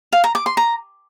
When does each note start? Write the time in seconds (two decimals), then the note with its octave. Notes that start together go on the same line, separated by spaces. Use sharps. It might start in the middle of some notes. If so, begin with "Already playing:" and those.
0.13 F5
0.24 A#5
0.35 D6
0.46 C6
0.57 A#5